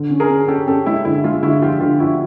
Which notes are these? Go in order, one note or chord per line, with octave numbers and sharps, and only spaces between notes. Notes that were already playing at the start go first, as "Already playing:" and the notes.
Already playing: D3
C#4
G#4 A#4
C#4
C#4 G4 A4
C#4 G4 A4
G#3 E4
D3 E4
G#3 F4
D3 E4 F#4
F3 F4 G4
D3 F4 G4
F3 E4 F#4